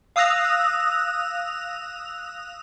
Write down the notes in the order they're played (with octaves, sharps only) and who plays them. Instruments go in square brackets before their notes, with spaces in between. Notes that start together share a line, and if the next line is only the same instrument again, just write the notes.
[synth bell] F5 D#6 E6 F#6 A#6 F7